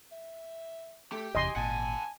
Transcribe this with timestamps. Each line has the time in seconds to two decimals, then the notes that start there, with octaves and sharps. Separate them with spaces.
0.12 E5
1.12 A3 G4
1.35 F#1 E2 C3 D#5 G#5 C6
1.56 G#1 A#2 F#5 G#5 A5